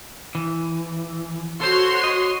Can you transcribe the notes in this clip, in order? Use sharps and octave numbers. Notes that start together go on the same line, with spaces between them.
E3
F#4 A4 C5 C#5 C6
D#5